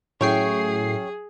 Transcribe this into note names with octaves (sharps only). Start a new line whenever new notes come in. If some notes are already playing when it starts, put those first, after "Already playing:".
A2 F#3 C#4 G#4 C#5 E5 G5 C7